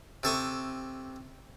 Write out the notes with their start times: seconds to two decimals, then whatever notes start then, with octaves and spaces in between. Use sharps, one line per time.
0.23 C3 A4 C#6 D#6